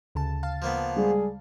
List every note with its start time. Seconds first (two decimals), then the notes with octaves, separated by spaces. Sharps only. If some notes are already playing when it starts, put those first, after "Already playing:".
0.15 D2 C#3 A5
0.43 F5 A5
0.62 F3 A#3 B3
0.96 G3 G#3 G#4